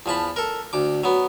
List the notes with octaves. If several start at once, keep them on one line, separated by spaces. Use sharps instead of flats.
E2 F3 A5 B5
A4 A#4
D2 D6
F#3 B3